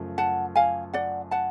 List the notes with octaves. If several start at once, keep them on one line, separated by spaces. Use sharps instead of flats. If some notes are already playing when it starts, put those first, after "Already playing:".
Already playing: F#2 C#3 F3 A3
F#5 A5
F5 G#5
D5 F#5
F#5 A5